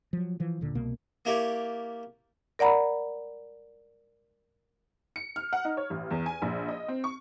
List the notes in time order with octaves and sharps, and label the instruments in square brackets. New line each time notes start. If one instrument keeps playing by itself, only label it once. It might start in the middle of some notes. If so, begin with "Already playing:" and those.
[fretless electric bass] F3 F#3
E3 F3
D#1 A#2 D3
C2 B2 A#3
[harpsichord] A#3 E4 G4 A#4 C#5 D5
[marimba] A#4 D5 F#5 A#5 B5
[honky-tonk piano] C#7
F6
F#5
D#4
C#5
A1
E2
G#5
A#1
D#5
C4
C#6